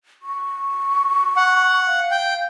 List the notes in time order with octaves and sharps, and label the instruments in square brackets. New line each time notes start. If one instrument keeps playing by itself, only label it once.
[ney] C#6
[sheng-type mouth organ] F#5
[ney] F5
[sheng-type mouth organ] G5